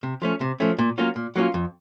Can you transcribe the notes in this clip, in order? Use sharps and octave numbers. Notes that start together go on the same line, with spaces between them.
C3
F3 A3 C#4
C3
F3 A3 C#4
A#2
F#3 A#3 C#4 F4
A#2
F#3 A#3 C#4 F4
F2